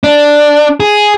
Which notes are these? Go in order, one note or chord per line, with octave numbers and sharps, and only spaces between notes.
D4
G#4